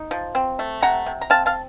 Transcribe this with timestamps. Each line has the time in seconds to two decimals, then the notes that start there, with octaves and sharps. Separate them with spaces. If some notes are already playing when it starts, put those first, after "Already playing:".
Already playing: D#4
0.11 F3
0.35 C4
0.59 A3
0.82 C3 F#5 A#5
1.06 C3
1.21 A#5
1.30 C4 F5 A5
1.46 F5 A5